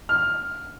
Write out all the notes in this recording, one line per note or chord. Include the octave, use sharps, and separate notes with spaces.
F6